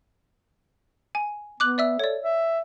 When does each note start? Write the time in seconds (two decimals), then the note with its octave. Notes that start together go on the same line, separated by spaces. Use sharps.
1.15 G#5
1.60 B3 D6 F#6 F#7
1.78 D5 E5 E6
1.99 A4 C#5 D5
2.22 E5